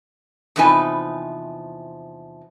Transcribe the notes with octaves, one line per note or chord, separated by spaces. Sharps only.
E2 C3 F3 D#4 B4 G#5